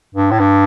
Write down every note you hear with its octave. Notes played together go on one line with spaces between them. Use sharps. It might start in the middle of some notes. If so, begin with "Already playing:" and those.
G2
A2
G2